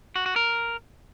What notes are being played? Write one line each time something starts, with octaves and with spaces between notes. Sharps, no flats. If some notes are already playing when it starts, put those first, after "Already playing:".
F#4
F#4
A#4